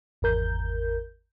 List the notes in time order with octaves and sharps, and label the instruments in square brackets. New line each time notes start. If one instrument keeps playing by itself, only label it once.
[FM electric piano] G#1 E2 A#4 G6